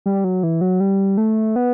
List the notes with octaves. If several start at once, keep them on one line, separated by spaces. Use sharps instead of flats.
G3
F#3
E3
F#3
G3
A3
B3